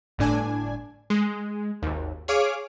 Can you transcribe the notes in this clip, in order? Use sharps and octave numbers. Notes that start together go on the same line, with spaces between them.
G1 A2 D4 G#5
G#3
G#1 D#2
G#4 C#5 F5 D6